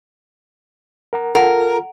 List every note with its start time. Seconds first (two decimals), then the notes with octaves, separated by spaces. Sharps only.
1.13 A#4 F#5 A#5
1.35 F4 A4 A#4 F#5